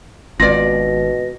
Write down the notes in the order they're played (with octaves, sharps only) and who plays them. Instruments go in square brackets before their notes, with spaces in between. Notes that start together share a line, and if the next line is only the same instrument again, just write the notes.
[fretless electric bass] G#1 [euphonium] B2 [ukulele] F4 D5 [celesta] A#6